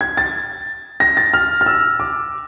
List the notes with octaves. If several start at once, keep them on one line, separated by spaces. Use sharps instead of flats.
G#6
A6
A#6
A6
F6
F6
E6
D6